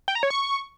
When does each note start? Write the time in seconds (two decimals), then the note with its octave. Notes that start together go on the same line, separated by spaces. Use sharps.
0.08 G5
0.15 A#5
0.23 C#5
0.30 C#6